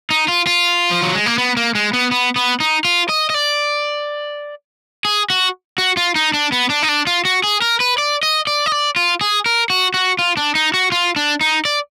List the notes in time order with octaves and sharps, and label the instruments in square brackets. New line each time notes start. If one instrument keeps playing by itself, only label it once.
[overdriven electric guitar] D#4
F4
F4
F3
F#3
G#3
A#3
B3
A#3
G#3
B3
B3
B3
D#4
F4
D#5
D#5
D5
G#4
F#4
F#4
F4
D#4
D4
B3
D4
D#4
D4
F4
F#4
G#4
A#4
B4
D5
D#5
D5
D#5
D5
F4
G#4
A#4
F#4
F#4
F4
D4
D#4
F#4
F4
D4
D#4
D5